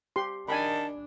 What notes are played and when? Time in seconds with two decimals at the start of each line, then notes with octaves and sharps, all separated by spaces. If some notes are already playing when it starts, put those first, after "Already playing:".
0.16 G4 C6
0.48 D#3 D4 G#5 A5 B5